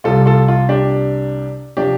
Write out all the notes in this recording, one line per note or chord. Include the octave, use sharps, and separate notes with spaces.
C2 C3 G3 F4 A4
F4 A4
F4
D4 G4
C3 F3 D4 G4